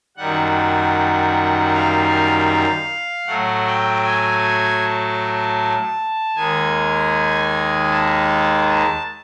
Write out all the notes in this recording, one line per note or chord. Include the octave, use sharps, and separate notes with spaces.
F#2 D#3 G3 F#5
F5
A2 F#3 A3 F#5
G5
G#5
A5
D#2 D#3 G#3 G#5
A5
A5